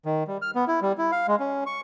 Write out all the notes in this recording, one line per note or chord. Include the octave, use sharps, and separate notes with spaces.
D#3
G3
F6
B3
E4
G3
E4
F5
G#3
C#4
C#6